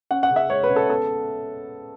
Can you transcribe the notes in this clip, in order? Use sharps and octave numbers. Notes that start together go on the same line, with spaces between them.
C#4 F#5
F#5
C#3
E5
G#3 C#5
B4
C#3
A4
B3 A4